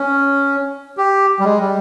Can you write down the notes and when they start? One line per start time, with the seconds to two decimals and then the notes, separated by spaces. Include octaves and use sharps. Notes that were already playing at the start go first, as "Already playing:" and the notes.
Already playing: C#4
0.97 G4
1.39 G3
1.44 G#3
1.61 G3